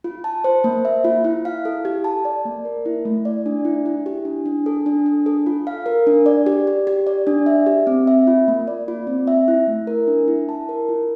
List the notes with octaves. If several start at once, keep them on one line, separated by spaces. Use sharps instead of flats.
F4
A5
C5
A#3
E5
F4
E4
F5
A4
G4
A5
D5
A#3
A#4
E4
A3
D5
D4
E4
E4
G4
D4
D4
A4
D4
D4
A4
F4
F5
A#4
D4
D5
G4
G4
G4
D5
D4
E5
G4
C4
E5
F4
A#3
D5
F4
C4
E5
E4
A3
A#4
D4
E4
A5
A#4
F4